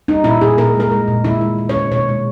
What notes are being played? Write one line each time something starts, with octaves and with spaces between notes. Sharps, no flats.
G3 D#4
A#2 E4
A#2 G#4
A#2 A#4
G#3
A#4
G#3
A#2
D#3 E4
G#3
G#3
C#5
D#3
B2 C#5
G#3